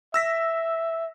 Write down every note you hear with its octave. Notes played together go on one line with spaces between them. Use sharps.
E5 E6 A#6 B6